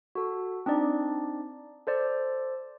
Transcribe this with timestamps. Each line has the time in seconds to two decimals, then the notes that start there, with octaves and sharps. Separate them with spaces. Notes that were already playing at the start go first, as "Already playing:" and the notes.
0.15 F#4 A4
0.66 C4 D4 D#4 D5
1.87 A4 C5 D5